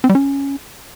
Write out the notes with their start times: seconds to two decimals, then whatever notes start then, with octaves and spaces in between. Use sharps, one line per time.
0.04 C4
0.09 G3
0.15 C#4